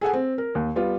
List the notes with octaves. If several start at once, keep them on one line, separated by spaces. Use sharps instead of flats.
G#4 A4 F#5 G#5
C4
A#4
D#2
G3 B3 F4